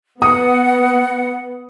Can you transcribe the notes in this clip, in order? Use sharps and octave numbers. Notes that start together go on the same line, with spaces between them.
B3 F#5 D#6